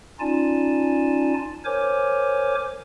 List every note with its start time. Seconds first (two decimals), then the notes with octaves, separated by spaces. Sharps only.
0.20 C#4 D#4 F4 D5 G#5 A5
1.65 A#4 C5 C#5 G#5 D6